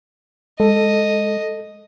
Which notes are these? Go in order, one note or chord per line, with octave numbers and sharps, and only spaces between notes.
G#3 A4 D#5